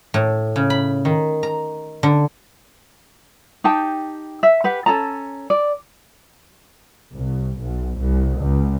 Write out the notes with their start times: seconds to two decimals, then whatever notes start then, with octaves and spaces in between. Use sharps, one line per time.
0.14 A2
0.56 C#3
0.70 B5
1.05 D#3
1.43 A#5
2.03 D3
3.64 D#4 G4 G5 A5
4.43 E5
4.64 G4 B4 F#5
4.86 C#4 A4 A5 A#5
5.50 D5
7.14 C2
7.61 B1
8.00 C2
8.40 C#2